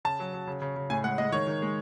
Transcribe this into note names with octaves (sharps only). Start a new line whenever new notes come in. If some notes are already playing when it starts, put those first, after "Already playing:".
C#3 A5
F#3
F#3
C#3
C#3
C#3
A2 G#5
G#3 F#5
G#3 D#5
D#3 C#5
D#3
G#3